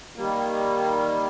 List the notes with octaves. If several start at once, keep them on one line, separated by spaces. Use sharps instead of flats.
D#3 G3 A#3